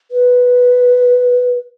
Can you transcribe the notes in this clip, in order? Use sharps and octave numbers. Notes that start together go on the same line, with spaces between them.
B4